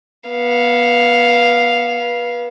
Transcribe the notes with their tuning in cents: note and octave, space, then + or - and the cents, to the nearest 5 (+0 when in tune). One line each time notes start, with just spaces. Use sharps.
B3 -25 F5 +0